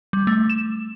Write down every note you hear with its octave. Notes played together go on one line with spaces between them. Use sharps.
G3
A3
E7